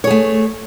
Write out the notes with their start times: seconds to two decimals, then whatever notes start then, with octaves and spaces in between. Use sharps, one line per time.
0.04 C#5
0.07 G#4
0.11 A3